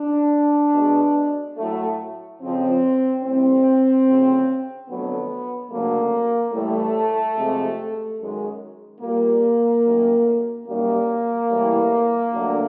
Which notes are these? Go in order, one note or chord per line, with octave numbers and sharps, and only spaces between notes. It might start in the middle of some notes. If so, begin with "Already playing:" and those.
Already playing: D4
B2 G#3
A2 F#3 A3
F2 C#3 F3 C4
A2 E3 G3 C4
D2 C#3 F3
F2 D3 F#3 A3 B3
D2 C#3 F#3 A3 A#3
A2 E3 G3 A3
F2 C3 F3 G#3
F#2 D#3 G#3
A#2 G3 A#3
F#2 D#3 F#3 A3
F#2 D#3 G3 A#3
A2 E3 G3
G2 D3 F#3 A3